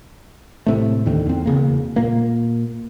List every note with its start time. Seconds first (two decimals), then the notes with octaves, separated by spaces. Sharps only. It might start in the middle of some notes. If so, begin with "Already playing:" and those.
0.66 A2 C3 A3
1.06 D#2 D3 D#3
1.25 E2 C4
1.45 E1 C#3 A#3
1.96 A#2 A#3